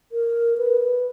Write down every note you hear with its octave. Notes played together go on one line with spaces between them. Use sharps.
A#4
B4